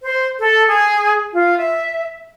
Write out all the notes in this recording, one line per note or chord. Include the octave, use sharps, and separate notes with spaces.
C5
A4
G#4
F4
E5